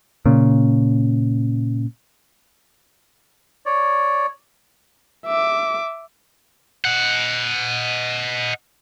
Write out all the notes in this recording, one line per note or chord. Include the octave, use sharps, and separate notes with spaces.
A#2 C#3
C#5 D5
E5 D6
D#5 F#5